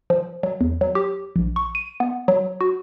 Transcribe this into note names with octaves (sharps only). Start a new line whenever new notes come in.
F3
F#3
E2
F#3
G4
A#1
C#6
D#7
B3
F#3
F#4